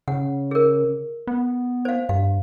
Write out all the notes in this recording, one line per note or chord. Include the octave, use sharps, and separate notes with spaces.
C#3 F#5
G#4 A#4
B3
C5 F5
G2 F5